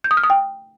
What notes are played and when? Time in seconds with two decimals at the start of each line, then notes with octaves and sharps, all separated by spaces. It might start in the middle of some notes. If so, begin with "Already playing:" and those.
0.04 G6
0.11 D#6
0.17 F6
0.23 D#6
0.30 G5